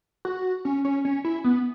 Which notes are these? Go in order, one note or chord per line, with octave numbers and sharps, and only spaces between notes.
F#4
C#4
C#4
C#4
E4
B3